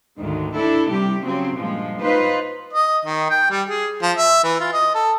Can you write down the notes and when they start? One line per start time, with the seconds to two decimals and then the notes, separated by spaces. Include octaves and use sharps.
0.18 D2 G#2 D#3
0.55 D4 E4 A4
0.90 C3 G3 G4
1.23 C#3 F#3 C4
1.55 G2 A#2 F3 G#3
2.01 D#4 F4 B4 C5
2.73 D#5
3.05 D#3
3.30 G5
3.50 G3
3.67 G#4
4.02 F3
4.17 E5
4.44 E3
4.60 F4
4.73 D#5
4.95 A4